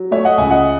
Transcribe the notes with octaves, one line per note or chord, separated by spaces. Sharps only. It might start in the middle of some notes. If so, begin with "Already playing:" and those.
Already playing: F#3
A3 C#5 E5
D#5 F#5
C#2 E5 G#5
D#5 F#5